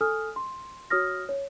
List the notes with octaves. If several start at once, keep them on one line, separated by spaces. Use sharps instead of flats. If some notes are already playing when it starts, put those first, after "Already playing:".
A4 G#5 D#6 F6
C6
F#4 C#5 D#6 F6 A#6
C#5